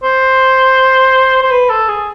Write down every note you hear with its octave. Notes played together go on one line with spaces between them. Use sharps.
C5
C5
B4
A4
G#4